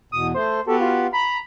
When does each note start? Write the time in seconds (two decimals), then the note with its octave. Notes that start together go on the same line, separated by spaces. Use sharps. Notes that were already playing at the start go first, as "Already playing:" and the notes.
0.12 E2 B2 D#6
0.34 A3 C5
0.67 B3 F#4 G4 A4
0.80 F4
1.13 A#5 B5